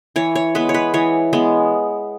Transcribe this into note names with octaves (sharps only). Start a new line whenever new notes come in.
E3 C#5
C#5
G#3 B3 B4
C#5
B4
E3 C#5
G#3 B3